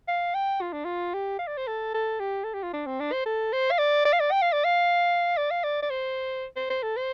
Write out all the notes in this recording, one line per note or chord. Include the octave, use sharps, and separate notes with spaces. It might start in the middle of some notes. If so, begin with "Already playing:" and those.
F5
G5
F4
D4
F4
G4
F5
D5
C5
A4
A4
G4
A4
G4
F4
D4
C4
D4
C5
A4
C5
F5
D5
D5
F5
D5
G5
F5
D5
F5
D5
F5
D5
D5
C5
C5
C5
A4
C5